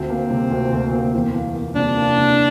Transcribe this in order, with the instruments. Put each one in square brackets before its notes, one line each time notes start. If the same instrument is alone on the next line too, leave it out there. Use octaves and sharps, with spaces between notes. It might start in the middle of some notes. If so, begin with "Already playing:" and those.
Already playing: [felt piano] D2 [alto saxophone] C4
[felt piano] A#3
C3
D2
D2
A#3
E2
A#3
A#3
[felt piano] C3 [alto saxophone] D4
[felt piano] A#3
C3